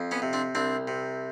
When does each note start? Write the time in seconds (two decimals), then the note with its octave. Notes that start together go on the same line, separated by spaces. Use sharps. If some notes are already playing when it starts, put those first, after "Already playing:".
Already playing: F2
0.11 B3 C#4
0.22 C3
0.33 C4 D4
0.55 C2 C4 D4
0.88 C3